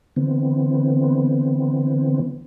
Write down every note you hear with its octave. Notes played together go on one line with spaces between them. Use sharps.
D3 E3 B3 C4